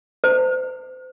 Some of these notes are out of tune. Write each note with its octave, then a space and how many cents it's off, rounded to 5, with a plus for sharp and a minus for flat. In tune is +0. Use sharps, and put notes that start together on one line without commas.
C5 -35